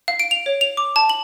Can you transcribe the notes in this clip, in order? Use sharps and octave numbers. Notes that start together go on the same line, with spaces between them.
F5
D7
F7
C#5
F7
D6
A5
F#7